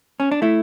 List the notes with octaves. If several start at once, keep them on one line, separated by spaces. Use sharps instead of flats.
C#4
D4
A3 E4